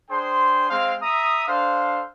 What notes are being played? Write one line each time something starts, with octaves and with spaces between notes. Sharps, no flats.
D4 G#4 C5 G5 C6
G#3 C4 C5 F5
E5 A#5 D#6
D4 A4 C5 F5